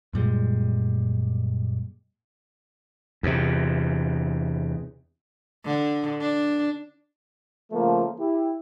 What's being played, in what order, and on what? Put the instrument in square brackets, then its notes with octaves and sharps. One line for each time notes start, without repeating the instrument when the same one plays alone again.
[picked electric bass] F#2 A#2 G3 G#3
[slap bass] E2 C3
[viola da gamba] D3
D4
[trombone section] C#3 F3 A3 A#3
E4 G4